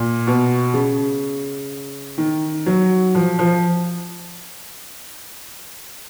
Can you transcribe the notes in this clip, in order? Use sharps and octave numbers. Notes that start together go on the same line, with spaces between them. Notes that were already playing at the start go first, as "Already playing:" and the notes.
Already playing: A#2
B2
C#3
D#3
F#3
F3
F3